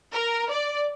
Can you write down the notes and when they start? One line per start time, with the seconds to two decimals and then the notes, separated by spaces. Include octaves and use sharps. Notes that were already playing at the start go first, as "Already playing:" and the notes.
0.12 A#4
0.51 D5